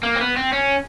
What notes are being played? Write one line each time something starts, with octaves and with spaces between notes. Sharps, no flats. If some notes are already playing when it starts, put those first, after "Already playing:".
A#3
C4
B3
C4
C#4